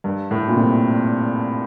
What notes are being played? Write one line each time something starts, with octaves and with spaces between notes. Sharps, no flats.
G2
A2
A#2
C3